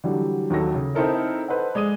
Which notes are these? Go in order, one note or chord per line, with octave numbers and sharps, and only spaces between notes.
D3 E3 F#3 G3
D#2 D#3 F#3 D#4 A4 A#6
C#3
C4 D#4 E4 A4 A#4 C#5
A4 B4 C5 D#5 F#5
G#3 D5 D#6 D#7